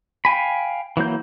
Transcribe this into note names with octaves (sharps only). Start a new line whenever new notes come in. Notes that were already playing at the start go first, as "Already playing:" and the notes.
F5 G5 G#5 B5
E3 F#3 A#3 G6